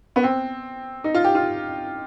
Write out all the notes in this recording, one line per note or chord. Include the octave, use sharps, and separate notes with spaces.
B3
C4
D#4
F4
G4
F4